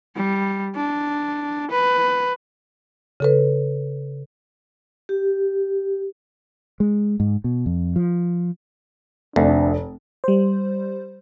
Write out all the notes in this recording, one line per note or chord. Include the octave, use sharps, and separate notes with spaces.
G3
D4
B4
C#3 A4 B4
G4
G#3
G#2
B2
F2
F3
F1 D2 D4
G3 C5